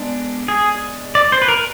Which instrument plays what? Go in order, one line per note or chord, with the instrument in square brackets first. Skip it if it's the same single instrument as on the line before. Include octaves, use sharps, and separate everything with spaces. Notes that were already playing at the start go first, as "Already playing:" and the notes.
Already playing: [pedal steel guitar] G#3 B3 D4
G#4
D5
C5
B4
A#4